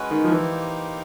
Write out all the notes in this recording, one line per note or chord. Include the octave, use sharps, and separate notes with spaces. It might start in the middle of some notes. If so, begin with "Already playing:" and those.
Already playing: G#3 C#4 F#4 B4
D#3
F3
E3 A#3 D#4 G4 C5